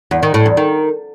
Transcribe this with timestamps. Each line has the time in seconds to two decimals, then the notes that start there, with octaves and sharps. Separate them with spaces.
0.11 E2
0.23 D#3
0.34 A2
0.46 E2
0.57 D#3